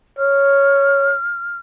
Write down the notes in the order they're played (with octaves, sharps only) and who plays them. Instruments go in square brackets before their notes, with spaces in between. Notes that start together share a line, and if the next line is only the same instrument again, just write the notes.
[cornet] C#5 [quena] F6